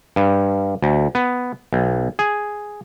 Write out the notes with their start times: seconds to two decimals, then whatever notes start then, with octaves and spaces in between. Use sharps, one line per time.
0.16 G2
0.83 D2
1.15 B3
1.73 B1
2.19 G#4